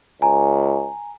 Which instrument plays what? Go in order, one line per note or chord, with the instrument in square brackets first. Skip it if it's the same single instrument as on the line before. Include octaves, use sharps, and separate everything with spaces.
[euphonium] C#2 [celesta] G#5 A#5